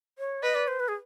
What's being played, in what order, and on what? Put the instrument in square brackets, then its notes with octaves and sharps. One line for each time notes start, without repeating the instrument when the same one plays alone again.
[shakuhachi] C#5
[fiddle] B4 [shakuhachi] D#5
[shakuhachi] D5
C5
B4
G#4